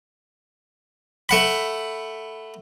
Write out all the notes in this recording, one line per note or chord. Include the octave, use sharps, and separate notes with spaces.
A3 F#5 B5